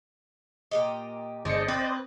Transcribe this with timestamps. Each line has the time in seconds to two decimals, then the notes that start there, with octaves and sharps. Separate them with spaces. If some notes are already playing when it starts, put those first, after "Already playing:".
0.71 A#2 G4 D#5
1.45 G1 G#3 D4 G#4 C5 D5 D#5 C#7
1.68 C4 B4